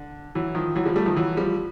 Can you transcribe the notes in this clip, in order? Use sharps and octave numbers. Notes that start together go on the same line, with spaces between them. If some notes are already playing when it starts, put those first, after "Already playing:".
Already playing: D3
E3 F#3
D#3 F3
E3 F#3
F3 G3
G3 A3
D#3 F3
E3 F#3
F3 G3